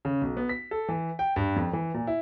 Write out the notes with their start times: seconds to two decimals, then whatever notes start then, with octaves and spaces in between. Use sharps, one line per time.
0.05 C#3
0.21 B1
0.37 B3
0.49 B6
0.71 A4
0.88 E3
1.19 G5
1.36 G2
1.56 F2
1.73 E3
1.94 A#2
2.07 E4